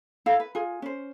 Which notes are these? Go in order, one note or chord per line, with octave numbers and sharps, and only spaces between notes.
E4 A4 F5
B4
F4 G#4
C#4 C5